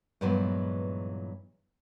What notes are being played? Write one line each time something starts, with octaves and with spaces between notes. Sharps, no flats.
G2 A#2 E3 F#3 G#3 B3